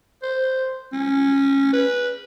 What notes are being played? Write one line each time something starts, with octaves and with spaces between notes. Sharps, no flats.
C5
C#4
B4